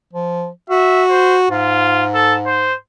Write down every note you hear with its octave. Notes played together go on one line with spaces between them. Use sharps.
F3
F#4 E5
C5
G#2 F4
A4
C5